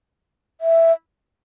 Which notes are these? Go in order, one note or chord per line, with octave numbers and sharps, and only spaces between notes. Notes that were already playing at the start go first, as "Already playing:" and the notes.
E5